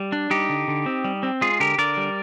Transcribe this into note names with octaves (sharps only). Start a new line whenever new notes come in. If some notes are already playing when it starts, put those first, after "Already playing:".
Already playing: G3
D4
G3 D#4 G4
D3
D3
C4
G3
C4
G#3 F4 G#4
D3 G4 A#4
D3 A#4 D5
G3